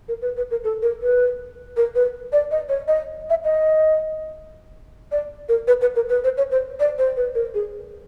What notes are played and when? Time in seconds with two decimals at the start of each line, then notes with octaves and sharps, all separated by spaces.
0.08 A#4
0.22 B4
0.37 B4
0.51 A#4
0.64 A4
0.82 A#4
1.02 B4
1.77 A#4
1.95 B4
2.32 D5
2.51 D#5
2.69 C#5
2.88 D#5
3.30 E5
3.44 D#5
5.12 D5
5.49 A#4
5.67 B4
5.81 B4
5.96 A#4
6.09 B4
6.24 C5
6.37 C#5
6.51 C5
6.80 D5
6.98 C5
7.16 B4
7.35 A#4
7.54 G#4